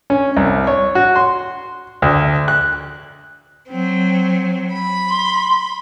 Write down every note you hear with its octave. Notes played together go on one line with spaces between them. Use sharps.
C#4
C2
C#5
F#4
C6
D2
F#6
F#3 C4
B5
C6